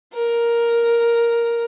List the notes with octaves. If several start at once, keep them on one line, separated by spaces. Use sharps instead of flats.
A#4